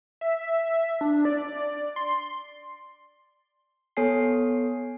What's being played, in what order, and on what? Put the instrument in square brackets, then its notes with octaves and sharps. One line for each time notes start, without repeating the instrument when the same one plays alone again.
[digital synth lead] E5
D4
D5
C6
[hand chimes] B3 A4 C#5 G#5 C7